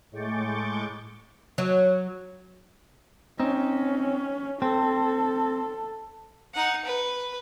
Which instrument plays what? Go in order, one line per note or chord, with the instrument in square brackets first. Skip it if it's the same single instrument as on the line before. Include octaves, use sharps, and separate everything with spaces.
[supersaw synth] A2 G#3 C#6 D6 G6 A6
[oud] F#3
[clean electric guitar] C4 D#4 [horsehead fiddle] C#4
[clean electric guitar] C4 [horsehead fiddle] A4
[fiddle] D#4 F#5
B4